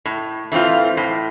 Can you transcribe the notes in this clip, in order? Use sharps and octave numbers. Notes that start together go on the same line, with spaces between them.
A2
E3 A3 C4 F4
A2